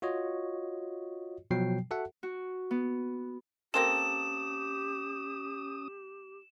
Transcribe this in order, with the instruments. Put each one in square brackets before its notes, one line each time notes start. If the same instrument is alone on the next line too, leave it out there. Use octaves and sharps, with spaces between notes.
[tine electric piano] F4 F#4 C#5 D#5
B2 F3 F#3 G5 C7
F#4 A4 E5 F#5
[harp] F#4
B3
[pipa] A#3 C4 A4 [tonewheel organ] C#4 D#6 [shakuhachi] G4 [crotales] E7